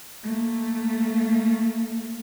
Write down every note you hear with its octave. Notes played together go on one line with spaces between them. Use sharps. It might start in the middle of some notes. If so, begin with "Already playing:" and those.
A3 A#3